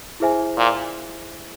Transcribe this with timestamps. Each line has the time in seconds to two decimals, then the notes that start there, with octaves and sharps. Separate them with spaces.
0.20 E4 G#4 C5 E5 G#5
0.57 A#2